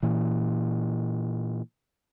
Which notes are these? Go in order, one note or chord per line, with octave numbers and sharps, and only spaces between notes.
A#2 E3